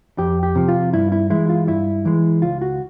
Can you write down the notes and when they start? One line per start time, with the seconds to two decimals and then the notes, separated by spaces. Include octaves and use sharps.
0.18 F2 G4
0.43 G4
0.55 C3 F3
0.68 F4
0.93 G2 E4
1.12 E4
1.30 E3 G#3 E4
1.49 F4
1.68 G2 E4
2.05 E3 G#3
2.42 C#2 F4
2.62 F#4